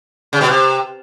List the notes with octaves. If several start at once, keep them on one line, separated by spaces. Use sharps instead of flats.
C#3
B2
C3